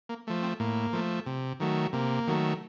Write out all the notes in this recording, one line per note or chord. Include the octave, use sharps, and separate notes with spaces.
A#3
F3 A3
C4
A2 A#3
F3 A3
C3
D#3 F#3 A3
C3 A#3
D#3 F#3 A3